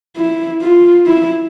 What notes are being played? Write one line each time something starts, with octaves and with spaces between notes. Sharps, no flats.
E4
F4
E4